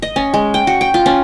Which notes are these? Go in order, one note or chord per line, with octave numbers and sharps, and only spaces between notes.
D#5
C#4
G#3
G5
F#4
G5
F4
C#4